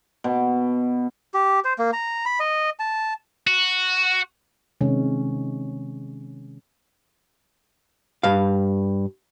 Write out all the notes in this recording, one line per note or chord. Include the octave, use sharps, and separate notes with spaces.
B2
G4
C5
A#3
A#5
B5
D#5
A5
F#4
C3 D#3 G#3 C#4
G2 F5